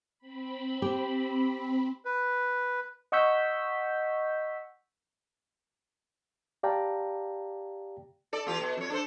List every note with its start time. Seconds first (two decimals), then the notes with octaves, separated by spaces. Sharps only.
0.19 C4 B5
0.82 G4
2.05 B4
3.12 D#5 F#5 C#6 E6 G6 B6
6.63 G4 D5 F5 G5 A5 A#5
8.33 A4 D5
8.47 E2 F4 G4
8.60 B2
8.77 F2 C#5
8.90 D4 A4 C5